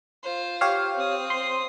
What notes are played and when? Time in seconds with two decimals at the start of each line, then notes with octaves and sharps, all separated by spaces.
0.23 F4 C5
0.61 G4 C#5 F5
0.96 C4 D#6
1.30 C6